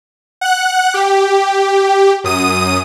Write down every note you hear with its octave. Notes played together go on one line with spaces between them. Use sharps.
F#5 F#6
G4
F#2 D#6 D#7